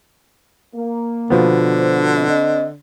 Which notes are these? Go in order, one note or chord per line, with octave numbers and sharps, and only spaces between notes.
A#3
B2 D3 F3 B3
D4 F#4 C5
C4 D5 D#5